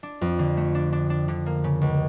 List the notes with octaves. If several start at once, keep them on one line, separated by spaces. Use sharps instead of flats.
D4
F2
D3
A3
D4
D4
D4
D3
A#3
C#3
C#2